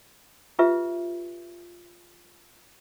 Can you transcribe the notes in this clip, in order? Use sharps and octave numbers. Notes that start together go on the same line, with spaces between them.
F4 G4 B4 E5